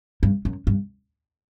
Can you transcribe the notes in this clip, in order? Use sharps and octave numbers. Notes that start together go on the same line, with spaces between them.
G2
F#2
G2